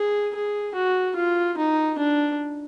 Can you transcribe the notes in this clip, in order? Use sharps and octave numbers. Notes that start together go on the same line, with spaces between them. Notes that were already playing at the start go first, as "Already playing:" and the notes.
Already playing: G#4
G#4
F#4
F4
D#4
D4